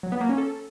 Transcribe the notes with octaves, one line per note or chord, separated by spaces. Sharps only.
F#3
B3
A#3
C#4
A4